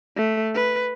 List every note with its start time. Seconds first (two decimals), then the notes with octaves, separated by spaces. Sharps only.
0.16 A3
0.55 B4